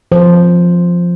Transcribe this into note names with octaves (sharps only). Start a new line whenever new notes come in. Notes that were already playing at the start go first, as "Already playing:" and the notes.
F3 C5